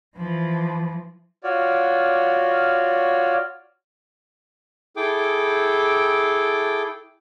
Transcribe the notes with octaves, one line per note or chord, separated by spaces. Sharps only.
E3 F3
F4 F#4 C#5 D5
E4 G#4 A4 G5 D6